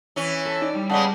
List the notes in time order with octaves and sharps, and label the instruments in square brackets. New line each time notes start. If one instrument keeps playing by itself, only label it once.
[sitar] E3 C#4
[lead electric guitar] A4
[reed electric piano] D#4 [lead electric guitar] D5
[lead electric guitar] G3
[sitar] C#3 G#3 B3 [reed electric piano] D5 F#5 A5